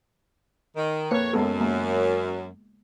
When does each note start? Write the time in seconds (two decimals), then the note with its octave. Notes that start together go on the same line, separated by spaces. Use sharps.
0.76 D#3
1.11 F2 A#3 B4 C#5
1.33 F#2 G#3 B3 A4
1.60 G#3 A#3